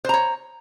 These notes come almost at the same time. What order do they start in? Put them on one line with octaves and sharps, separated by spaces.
C5 A#5 C#5